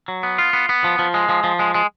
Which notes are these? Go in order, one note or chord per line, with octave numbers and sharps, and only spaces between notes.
F#3
B3
F4
B3
B3
F3
F3
G#3
F3
F3
G#3
G#3